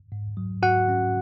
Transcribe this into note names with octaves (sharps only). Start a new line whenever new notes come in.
G#2
F#3
G#2 F#4 F#5
C#4